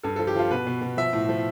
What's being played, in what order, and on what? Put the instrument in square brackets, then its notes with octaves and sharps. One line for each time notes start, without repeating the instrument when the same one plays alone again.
[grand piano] G2 A4
F3 A4
G4
F3 F4
B2 B4
B2
B2
F3 E5
A2
F3